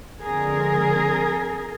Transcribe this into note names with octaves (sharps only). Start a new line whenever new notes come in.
D3 F3 G#3 C4 G#4 A#4